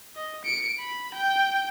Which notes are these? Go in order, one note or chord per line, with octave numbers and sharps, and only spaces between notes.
D#5
C#7 D7
B5
G5